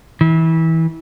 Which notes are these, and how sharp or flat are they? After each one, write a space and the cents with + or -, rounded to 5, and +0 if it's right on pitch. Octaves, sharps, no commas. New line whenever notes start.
E3 -25